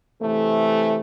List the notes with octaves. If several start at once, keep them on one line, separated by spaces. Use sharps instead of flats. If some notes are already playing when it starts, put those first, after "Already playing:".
C3 E3 A3